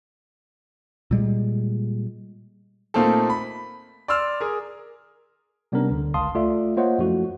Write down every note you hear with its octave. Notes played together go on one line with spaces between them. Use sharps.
A#2 G3 G#3
A#2 A3 A#3 C4 D#4 A4
B5
D5 C6 E6 F6
G#4 A#4
C3 G3 B3 C#4 D4 A#4
D2 D3
G1 C#2 F5 A5 C6 D#6
A3 F4 D5 E5
A#3 F4 C5 C#5 D#5 F#5
F#2 F3 A3 E4 F#4